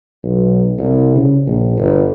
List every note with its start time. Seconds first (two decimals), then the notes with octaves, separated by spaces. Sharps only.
0.23 B1
0.78 C2
1.16 C#3
1.47 A#1
1.77 G1